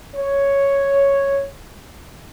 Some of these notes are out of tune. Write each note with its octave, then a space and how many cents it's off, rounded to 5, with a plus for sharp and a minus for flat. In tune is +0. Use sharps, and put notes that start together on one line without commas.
C#5 +0